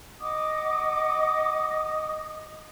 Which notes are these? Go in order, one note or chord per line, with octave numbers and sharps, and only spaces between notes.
D#5 F#5 D6 D#6